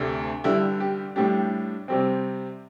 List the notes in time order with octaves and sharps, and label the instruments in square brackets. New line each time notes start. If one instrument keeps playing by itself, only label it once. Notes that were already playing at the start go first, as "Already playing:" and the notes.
Already playing: [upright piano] D2 C3 A3 D4
G2 D3 G3 E4
G4
A2 G3 D4 G4
C3 G3 C4